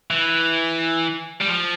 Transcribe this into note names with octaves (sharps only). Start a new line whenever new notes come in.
E3
G3
F3